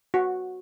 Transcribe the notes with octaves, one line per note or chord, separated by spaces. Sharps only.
F#4